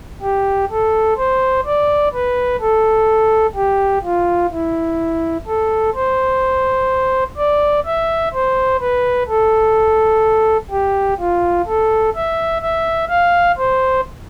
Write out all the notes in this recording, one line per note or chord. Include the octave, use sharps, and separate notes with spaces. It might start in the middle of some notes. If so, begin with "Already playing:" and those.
G4
A4
C5
D5
B4
A4
G4
F4
E4
A4
C5
D5
E5
C5
B4
A4
G4
F4
A4
E5
E5
F5
C5